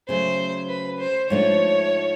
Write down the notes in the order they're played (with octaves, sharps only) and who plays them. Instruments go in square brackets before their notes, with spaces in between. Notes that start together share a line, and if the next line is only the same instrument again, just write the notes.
[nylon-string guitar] C#3 F#3 A3 [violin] C5
[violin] B4
C5
[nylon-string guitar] G#2 F3 A3 D4 [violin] C#5